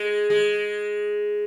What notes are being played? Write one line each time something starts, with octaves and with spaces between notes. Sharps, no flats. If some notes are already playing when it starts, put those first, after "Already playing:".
Already playing: G#3
G#3